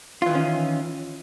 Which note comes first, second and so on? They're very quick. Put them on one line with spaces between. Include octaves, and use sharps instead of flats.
F4 E3 D#3 C#4